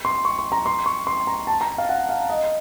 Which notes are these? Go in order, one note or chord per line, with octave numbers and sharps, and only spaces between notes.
C6
C#6
C6
A#5
C6
C#6
C6
A#5
A5
A#5
F5
F#5
F5
D#5